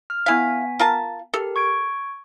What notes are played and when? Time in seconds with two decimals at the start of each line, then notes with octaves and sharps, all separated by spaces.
0.10 F6
0.26 B3 E4 F5 G#5 B6
0.79 F4 A#4 A5
1.34 G4 A4 A#4
1.56 C#6 G#6 D7